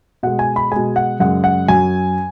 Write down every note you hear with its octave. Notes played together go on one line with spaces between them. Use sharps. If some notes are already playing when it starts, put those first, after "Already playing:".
B2 G#3 F#5
G#5
B5
B2 G#3 G#5
F#5
F#2 C#3 G#3 F#5
F#5
F#2 F#3 G#5